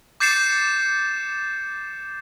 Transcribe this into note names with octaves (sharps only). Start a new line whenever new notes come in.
D6 G6 A6 C7 C#7 E7